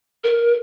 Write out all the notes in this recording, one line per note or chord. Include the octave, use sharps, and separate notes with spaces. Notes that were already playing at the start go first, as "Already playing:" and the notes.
A#4